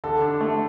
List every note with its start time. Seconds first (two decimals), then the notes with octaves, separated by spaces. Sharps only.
0.04 D3 A4
0.22 D4
0.41 A3